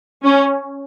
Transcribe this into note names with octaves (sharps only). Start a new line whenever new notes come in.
C#4